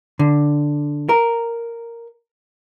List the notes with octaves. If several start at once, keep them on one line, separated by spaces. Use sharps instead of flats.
D3
A#4